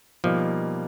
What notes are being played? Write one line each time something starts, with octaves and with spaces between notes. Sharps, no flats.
B2 F3 G3 A#3 D#4